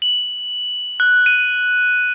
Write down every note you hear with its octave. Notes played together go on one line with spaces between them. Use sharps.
F#7
F#6
D#7